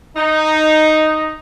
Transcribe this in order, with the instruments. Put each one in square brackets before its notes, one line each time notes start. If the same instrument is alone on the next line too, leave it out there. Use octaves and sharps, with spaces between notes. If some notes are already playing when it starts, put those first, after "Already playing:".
[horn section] D#4